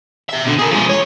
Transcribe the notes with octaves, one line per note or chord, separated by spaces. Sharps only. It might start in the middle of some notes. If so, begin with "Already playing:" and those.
G4 E5
B2 D3
G#4 A#4
F3 G#3
C#5